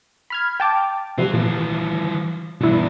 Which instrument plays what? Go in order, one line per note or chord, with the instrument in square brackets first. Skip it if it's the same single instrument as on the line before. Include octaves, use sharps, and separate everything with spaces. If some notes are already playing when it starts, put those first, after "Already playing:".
[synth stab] B5 F6 G#6
G5 A5 D6
[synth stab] C3 F3 G3 [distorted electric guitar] C4 F5
[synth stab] A#2 [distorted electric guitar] E3 F3
[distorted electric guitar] E2 G2 [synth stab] B2 E4